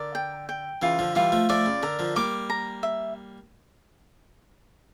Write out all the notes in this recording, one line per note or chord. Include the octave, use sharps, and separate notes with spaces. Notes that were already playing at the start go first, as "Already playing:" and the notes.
Already playing: D3 A#4 D5
G5
G5
C#3 E3 F4
D3 F3
E3 G3 F4
F3 A3
F3 A3 D5
C#3
D3 A#4
D3 F3
G3 A#3 D6
A#5
E5